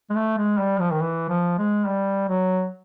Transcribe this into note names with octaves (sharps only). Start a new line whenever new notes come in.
G#3
A3
G#3
G3
F3
D#3
E3
F3
G#3
G3
F#3